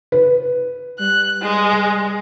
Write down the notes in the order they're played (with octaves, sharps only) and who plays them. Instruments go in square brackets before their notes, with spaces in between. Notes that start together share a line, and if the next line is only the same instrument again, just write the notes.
[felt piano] B4
[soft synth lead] G3 [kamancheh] F#6
[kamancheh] G#3